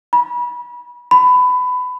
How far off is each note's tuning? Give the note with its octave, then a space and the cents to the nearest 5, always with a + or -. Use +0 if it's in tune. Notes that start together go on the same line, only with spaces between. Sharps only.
B5 -30
B5 +20